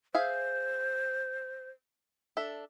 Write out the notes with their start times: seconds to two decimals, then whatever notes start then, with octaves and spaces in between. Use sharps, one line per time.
0.15 G#4 C5 E5 F5
2.37 D4 A4 E5